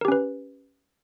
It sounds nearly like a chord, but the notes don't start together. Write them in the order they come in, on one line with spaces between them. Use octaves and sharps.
A#4 G4 C#4 B4